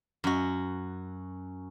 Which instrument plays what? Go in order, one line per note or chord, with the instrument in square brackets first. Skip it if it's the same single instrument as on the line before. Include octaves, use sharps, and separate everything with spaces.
[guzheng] F#2 F#4